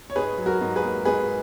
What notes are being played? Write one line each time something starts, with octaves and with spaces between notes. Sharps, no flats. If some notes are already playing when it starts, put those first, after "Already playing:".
C#5
G#2 G#4 B4
F#3
F#4 A#4
G#2
G#4 B4
A#3
G#2 G#4 B4